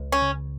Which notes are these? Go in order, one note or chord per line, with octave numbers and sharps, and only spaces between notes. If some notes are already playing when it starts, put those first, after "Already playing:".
Already playing: C#2
C#4
C#3